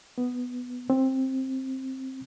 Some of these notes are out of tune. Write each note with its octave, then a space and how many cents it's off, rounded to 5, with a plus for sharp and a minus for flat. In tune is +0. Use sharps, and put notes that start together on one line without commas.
B3 +5
C4 +10